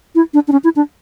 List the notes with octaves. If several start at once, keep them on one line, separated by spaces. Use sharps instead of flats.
E4
D4
D4
C#4
E4
D4